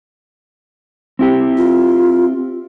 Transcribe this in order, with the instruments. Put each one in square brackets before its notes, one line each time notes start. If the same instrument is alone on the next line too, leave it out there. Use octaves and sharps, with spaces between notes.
[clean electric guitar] C4 E4 G4
[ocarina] F4